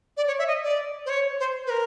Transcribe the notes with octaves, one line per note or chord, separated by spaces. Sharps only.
D5
C#5
E5
D#5
D5
C5
C#5
C5
B4
A#4